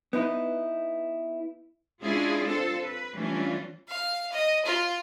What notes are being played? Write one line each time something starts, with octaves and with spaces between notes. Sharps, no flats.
B3 D#4 E4
G#3 C#4 D4 E4 F4 G#4
C4 F4 A4 C5
B4
E3 G3 A3 C#4 D4 F4
F5
D#5
F4